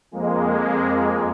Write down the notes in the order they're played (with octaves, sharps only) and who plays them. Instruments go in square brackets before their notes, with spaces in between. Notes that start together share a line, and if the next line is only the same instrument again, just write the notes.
[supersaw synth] F2 G#3 A#3